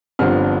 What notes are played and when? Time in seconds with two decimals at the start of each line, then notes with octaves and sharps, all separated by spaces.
0.19 G1 G2 D3 F3 C4 F6